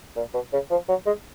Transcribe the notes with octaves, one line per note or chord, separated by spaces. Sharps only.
A#2
B2
C#3
F3
F#3
G#3